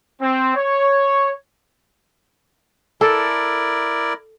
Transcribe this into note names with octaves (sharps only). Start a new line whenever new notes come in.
C4
C#5
E4 A4 A#4 D5